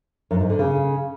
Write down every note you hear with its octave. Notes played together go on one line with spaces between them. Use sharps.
F#2
G#2
D3
C#3